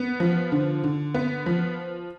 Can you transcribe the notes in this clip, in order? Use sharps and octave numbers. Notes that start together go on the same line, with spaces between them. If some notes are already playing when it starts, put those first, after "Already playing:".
Already playing: B3
F3
D3
D3
B3
F3